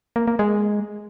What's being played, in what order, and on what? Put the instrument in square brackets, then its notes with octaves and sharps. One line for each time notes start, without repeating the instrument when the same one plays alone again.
[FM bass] A#3
A#3
G#3